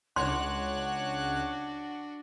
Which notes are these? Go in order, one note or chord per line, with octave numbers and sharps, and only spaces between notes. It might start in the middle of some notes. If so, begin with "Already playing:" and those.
C#2 D4 F#4 C#5 F#5 C6 F#6